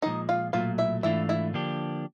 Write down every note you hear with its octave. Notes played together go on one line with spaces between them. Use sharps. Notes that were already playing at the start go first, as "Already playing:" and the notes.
A#2 F3 G#3 D#4 D#5
F4 F5
B1 A#2 F#3 A3 F4 F5
E4 E5
G#2 E3 A3 D4 E4 F4 E5
E4 E5
D3 F3 A#3 D4 G4